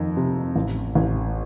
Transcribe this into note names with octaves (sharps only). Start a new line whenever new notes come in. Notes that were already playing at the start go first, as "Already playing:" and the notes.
Already playing: F2 D#3
C3
A1
A1